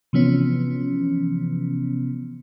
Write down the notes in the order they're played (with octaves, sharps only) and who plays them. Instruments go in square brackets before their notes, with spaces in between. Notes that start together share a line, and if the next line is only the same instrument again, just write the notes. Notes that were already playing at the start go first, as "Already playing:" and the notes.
[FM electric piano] C3 E3 F3 B3 C#4